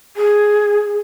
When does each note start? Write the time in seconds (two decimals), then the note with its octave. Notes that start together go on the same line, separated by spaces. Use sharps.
0.17 G#4